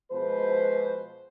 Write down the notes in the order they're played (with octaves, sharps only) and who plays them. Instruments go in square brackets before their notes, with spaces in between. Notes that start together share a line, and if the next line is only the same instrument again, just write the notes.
[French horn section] B2 F3 G#3 B4 C5